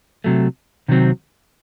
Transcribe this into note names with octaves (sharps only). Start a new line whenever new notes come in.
C3 F#3 A3
C3 D#3 F#3 C4